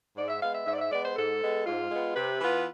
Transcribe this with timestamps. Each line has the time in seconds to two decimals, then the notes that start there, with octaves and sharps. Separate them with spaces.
0.16 G#2 D5
0.28 E5
0.40 G#3 B3 F5
0.53 E5
0.66 G#2 E5
0.73 D5
0.78 E5
0.90 G#3 B3 D5
1.02 C5
1.15 G#2 A4
1.41 G#3 B3
1.65 G#2 F4
1.89 G#3 B3
2.15 C3 B4
2.39 E3 B3 F4